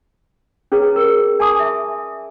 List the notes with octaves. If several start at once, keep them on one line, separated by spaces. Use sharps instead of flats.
C#4 G#4 B4 C#5 A#5
A#4
D5 G#5 A5 C6 D6 D#6
E5